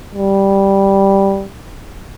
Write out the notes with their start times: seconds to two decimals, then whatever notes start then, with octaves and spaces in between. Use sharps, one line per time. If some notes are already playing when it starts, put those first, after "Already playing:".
0.15 G3